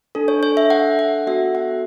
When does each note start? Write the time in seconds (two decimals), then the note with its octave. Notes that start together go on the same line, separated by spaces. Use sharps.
0.15 D4 A4
0.28 C#5
0.43 C#5
0.57 E5
0.70 F#5
0.99 F#5
1.27 B3 F#4 A4 E5
1.55 F#5